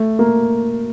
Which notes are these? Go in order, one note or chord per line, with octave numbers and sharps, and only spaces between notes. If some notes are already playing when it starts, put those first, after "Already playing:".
Already playing: A3
A#3